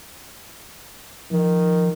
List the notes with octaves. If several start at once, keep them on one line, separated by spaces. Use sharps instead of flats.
D#3 F3